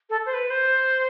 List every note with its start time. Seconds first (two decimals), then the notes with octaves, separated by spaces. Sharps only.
0.09 A4
0.25 C5
0.33 B4
0.50 C5